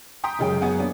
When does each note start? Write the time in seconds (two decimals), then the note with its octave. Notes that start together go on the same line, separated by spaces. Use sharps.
0.24 G5 A#5 C6 D#6 G6 B6
0.39 F1 F#2 C#3 G#3 G5
0.61 F#2 G#3 B3 F#5 G#5
0.78 A#3 B3 C#4 D4